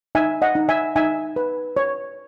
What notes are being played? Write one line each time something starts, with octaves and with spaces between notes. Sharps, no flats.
D#4 E5 G#5
D#5 F#5
D#4
E5 G#5
D#4 E5 G#5
B4
C#5